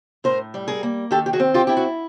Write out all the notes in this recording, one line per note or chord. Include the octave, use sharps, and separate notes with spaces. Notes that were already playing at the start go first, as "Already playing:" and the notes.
A2 A#4 C5
G3
G#4 A#4
A#3
D#3 G4 A4
G4
F#4 G#4
C4
F4 G4
E4 G4
F#4